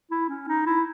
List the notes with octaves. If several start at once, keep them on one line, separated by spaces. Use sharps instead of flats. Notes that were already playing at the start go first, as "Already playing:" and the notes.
E4
C#4
D#4
E4